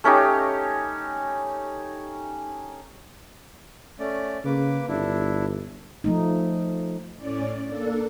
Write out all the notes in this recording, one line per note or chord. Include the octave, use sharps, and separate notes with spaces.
A3 C#4 D#4 G4
A3 C#4 D5
C#3 A#3 B4 D6
G1 D4 E4
F3 A3 D#4
A2 C#4 D5
A#3 D4 A4